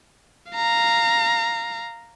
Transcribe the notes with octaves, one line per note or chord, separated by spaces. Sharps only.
F5 A#5